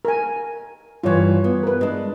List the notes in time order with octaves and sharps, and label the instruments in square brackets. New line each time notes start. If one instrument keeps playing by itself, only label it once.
[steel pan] A#4 G#5
[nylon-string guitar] G2 E3 [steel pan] F4 C#5
[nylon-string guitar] B3
[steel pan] A#4 B4
[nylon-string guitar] G#3 D4